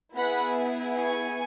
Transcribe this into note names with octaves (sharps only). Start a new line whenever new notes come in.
B3 E4 G#4 F#5 B5
G#5 C#6